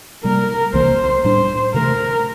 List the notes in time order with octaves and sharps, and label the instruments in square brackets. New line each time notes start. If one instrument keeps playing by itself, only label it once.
[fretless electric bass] C3 G3 A#3 [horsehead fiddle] A#4
[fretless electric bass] C2 C3 E3 A#3 [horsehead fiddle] C5
[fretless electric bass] A2 G3 D4 [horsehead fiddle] C5
[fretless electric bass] C3 E3 A3 [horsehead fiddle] A#4